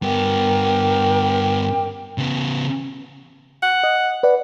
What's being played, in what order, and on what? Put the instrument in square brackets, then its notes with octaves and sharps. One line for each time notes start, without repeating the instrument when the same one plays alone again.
[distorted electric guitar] G2 B3 [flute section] A#4 G5 D6
[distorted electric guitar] C#3 B3
[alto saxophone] F#5
[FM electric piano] D#5
B4 D5 F#5